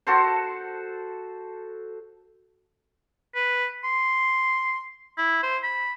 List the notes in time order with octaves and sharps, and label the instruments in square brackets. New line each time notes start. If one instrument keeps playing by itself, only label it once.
[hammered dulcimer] F#4 A4 C5
[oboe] B4
C6
E4
C5
B5